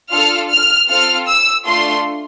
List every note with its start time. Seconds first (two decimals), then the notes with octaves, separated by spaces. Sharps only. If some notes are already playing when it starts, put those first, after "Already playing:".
0.12 D4 F4 A4 F6
0.50 F6
0.89 C4 F4 A4 F6
1.28 E6
1.66 A3 D4 F4 A4 C6